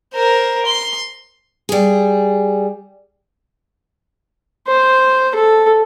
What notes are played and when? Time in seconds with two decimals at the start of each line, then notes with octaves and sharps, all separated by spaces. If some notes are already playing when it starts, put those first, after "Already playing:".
0.14 A#4 C5
0.66 C6
1.69 G3 G#4
4.67 C5
5.35 A4